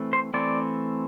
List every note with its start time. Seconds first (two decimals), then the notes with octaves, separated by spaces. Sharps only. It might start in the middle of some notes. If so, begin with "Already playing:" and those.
Already playing: E3 A3 C4
0.13 C5
0.34 E3 A3 C4 D5